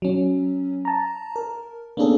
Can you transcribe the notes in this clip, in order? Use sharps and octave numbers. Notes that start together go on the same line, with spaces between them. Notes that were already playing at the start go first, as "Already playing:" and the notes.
F#3 C#4
A5 A#5
A#4
A#3 B3 C#4 D4 G#4 A4